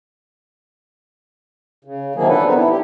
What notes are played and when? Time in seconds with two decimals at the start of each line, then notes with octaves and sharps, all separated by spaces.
1.84 C#3
2.15 C3 D#3 F3 F#3 A#3 G#4
2.28 D4 A4 B4
2.44 B3 C4 D#4
2.56 E4
2.69 G4